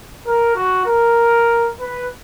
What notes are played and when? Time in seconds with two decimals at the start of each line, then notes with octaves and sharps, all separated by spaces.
0.25 A#4
0.55 F#4
0.86 A#4
1.79 B4